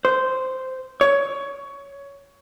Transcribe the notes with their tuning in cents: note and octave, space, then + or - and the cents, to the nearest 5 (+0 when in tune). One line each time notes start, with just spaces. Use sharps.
C5 -10
C#5 +15